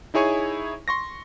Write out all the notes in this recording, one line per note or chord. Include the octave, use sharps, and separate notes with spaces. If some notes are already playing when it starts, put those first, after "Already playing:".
D#4 E4 G#4 C#5 G#5 C#6
C6 C#6 A#6